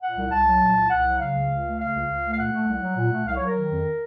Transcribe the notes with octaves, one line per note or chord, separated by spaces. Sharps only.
A#2 F#5
C2
C2 A5
F#3
A#2
C2
C2 F#5
F#3
C#3 F5
C#2
C#2
A3
C#3 F5
C#2
C#2
A3
F5
A#2 F#5
A3
C2
F#3
A#2
A3
C2 F5
F#3 C#5
A#4
D#3
F2